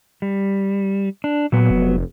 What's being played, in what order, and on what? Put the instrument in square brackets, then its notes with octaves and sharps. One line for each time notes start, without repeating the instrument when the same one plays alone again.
[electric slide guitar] G3
D4
[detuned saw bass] A#2 [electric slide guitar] F#3 B3
[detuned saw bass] F1